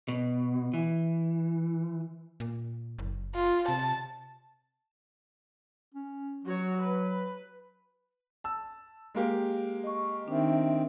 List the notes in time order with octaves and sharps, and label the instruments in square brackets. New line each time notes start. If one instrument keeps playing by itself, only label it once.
[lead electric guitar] B2
E3
[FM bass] A#2
F#1
[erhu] F4
[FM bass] C3 [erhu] A5
[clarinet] C#4
[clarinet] F#3 [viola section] F#4 C#5
[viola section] B4
[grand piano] A5 E6
G#3 A#3 G4
[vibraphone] D#5 C#6
[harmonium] D#3 C4 [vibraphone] D4 E5